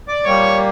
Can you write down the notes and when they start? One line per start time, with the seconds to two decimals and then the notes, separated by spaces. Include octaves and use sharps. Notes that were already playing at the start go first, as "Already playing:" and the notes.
0.08 D5 D6
0.24 A#2 G3 A#3 C#5 C#6